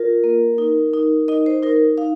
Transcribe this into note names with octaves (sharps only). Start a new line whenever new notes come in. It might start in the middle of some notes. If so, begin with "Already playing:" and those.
Already playing: F4 A#4
A#3
D#4
D#4
D#4 D#5
C5
D#4 A#4
D#4 F5